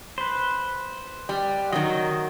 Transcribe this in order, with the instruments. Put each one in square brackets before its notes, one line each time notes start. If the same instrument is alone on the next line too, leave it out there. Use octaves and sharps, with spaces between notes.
[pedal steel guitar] B4 C5
[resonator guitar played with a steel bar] G3
[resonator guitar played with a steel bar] D#3 F#3 [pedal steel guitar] D#5